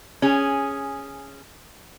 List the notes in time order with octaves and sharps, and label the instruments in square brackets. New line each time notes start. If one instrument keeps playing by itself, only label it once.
[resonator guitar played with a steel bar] C#4 G#4